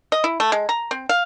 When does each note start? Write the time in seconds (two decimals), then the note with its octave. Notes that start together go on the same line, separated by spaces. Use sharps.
0.12 D#5
0.24 E4
0.40 A3
0.52 G#3
0.69 A#5
0.91 C4
1.09 F5